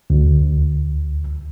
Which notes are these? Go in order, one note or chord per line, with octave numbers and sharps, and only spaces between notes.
D2